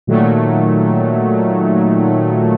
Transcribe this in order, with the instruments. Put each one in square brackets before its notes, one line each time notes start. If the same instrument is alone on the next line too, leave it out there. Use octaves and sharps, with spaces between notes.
[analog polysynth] A#2 D#3 F#3 A3